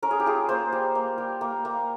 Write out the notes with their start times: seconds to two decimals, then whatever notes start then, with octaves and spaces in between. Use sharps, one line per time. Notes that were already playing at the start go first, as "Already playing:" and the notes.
0.02 C#4 A#4
0.11 G#4
0.20 G4
0.26 F4 G#4
0.49 A#3 C5
0.72 G3
0.95 A#3
1.18 G3
1.41 A#3
1.65 A#3